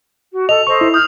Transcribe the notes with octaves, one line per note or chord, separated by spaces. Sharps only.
F#4
A4 D#5 F7
A4 C5 D#5 C#6
E4
D#6 F6 G6